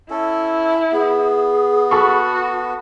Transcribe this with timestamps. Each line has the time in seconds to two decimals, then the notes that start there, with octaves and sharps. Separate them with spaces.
0.10 C#4 E4 A4
0.92 B3 G#4
1.91 F#4 A4 B5 C#6